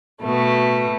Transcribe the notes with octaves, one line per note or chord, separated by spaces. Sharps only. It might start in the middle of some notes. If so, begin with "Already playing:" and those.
B2 A3